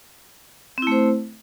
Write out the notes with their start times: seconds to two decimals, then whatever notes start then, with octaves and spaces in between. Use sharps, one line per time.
0.78 C4
0.82 E4
0.87 A3
0.92 C5